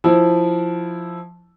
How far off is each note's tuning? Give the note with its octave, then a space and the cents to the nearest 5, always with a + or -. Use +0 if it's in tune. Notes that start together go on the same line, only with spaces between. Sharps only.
F3 +0 E4 +0